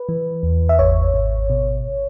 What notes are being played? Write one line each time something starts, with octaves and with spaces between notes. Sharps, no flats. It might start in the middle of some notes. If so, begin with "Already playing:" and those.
Already playing: B4
E3
E2
E5
G#1 C#5
G#1
B2